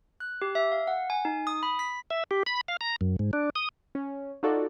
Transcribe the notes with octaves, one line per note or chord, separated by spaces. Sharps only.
F#6
G4
E5
F5
F#5
G#5
D#4
D#6
B5
B6
E5
G4
B5
F5
A#5
F#2
G#2
D4
D#6
C#4
D#4 F4 F#4 A4 D5